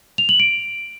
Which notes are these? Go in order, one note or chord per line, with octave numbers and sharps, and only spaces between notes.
F7
F#7
D7